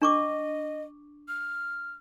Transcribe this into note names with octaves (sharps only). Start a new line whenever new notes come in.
D4 D#5 C#6 D6
F6